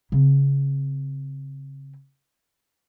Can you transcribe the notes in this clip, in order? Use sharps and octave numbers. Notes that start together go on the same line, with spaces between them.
C#3 C4